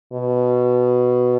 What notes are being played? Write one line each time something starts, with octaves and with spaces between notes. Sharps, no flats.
B2